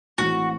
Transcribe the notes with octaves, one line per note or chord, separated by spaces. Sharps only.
A1 A2 E3 G#3 C4 F#4